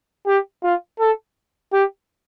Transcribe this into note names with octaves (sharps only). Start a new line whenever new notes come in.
G4
F4
A4
G4